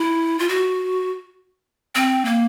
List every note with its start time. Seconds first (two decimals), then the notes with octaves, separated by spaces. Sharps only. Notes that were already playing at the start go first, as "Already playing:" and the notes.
Already playing: E4
0.39 F4
0.49 F#4
1.95 C4
2.25 A#3